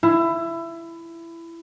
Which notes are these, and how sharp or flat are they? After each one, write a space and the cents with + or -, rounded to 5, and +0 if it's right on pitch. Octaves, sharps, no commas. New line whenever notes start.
E4 +20